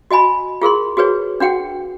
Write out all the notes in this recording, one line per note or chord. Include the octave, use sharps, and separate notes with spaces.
F#4 D#5 G#5 B5
F4 G#4 A#4 C6
F#4 G#4 B4 C#5
D4 F#4 F#5 G5